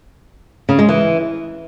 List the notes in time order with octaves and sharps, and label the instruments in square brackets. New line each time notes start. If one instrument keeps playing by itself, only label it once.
[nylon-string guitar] C#3
G#3
E3